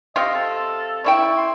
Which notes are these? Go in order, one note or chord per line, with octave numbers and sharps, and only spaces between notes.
C3 F4 D#5
A4
C#3 E4 G5 C#6
C6